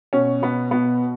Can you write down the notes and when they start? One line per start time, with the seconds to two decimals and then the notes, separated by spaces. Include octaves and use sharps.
0.13 B2 C#4
0.42 B2 B3
0.71 B2 B3